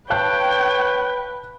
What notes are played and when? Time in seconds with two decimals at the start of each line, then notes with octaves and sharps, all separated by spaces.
0.10 B4 C#5 F5 G5 A5 F#6